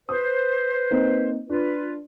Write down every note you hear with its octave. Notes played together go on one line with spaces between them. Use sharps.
B4 C5 D#6
A#3 C4 D#4
D4 F4 B4